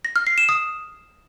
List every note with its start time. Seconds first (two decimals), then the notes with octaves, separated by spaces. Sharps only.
0.05 A#6
0.16 F6
0.27 C7
0.38 E7
0.49 D#6